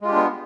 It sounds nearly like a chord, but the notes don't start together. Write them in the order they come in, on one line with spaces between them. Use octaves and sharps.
G#3 F4 G4 D4 B3